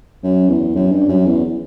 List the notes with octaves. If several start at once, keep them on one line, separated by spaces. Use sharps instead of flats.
F#2
E2
F#2
G2
F#2
E2